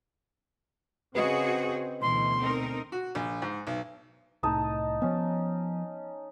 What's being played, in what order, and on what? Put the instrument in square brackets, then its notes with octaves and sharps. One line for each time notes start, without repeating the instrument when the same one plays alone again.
[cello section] C#3 F#4 G#4 [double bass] C4 [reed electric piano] B4 D#5
[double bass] D2 B2 [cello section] E3 [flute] C6
[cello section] C4 D#4 A#4
[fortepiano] F#4
A#1
G#2
B1
[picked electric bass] C2 A2 [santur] D#4 D#5 A5
[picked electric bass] F3 B3 [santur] C#4